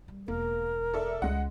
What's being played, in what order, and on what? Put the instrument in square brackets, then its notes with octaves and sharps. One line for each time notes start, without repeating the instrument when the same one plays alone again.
[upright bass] G3
[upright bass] E1 [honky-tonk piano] A#3 [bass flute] A#4
[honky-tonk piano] A4 D5 E5
[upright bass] C#2 [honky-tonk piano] G#3 D#5 F#5